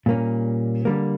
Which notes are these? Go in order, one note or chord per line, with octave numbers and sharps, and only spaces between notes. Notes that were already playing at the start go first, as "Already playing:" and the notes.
A#2 G3 A#3 C#4
D3 G3 A#3